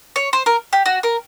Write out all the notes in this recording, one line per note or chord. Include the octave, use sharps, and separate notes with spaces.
C#5
C5
A#4
G4
F#4
A#4